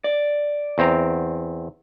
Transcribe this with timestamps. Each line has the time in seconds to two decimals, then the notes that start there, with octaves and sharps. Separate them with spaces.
0.04 D5
0.78 E2 C4 A#5